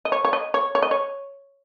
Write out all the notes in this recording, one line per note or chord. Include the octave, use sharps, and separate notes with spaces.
D#5
C#5
C#5
D#5
C#5
C#5
D#5
C#5